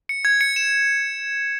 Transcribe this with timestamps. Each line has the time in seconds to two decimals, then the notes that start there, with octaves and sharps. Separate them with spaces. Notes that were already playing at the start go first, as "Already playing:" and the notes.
0.09 C#7
0.25 G#6
0.41 C#7
0.56 E7